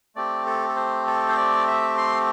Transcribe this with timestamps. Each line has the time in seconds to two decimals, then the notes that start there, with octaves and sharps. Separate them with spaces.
0.16 A3 C4 G4 D5
0.46 A4
0.69 A4
0.76 C5
1.07 A4
1.29 C5
1.37 D5
1.67 E5
1.98 C6